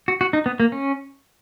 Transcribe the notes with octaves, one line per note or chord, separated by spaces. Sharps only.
F#4
F#4
D#4
B3
A#3
C#4